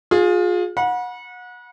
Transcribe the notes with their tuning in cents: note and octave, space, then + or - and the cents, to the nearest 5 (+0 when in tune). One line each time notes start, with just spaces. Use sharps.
F4 +30 G#4 +0
F#5 -30 B5 -40